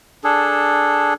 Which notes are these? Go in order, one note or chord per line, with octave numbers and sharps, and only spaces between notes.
D4 G#4 A4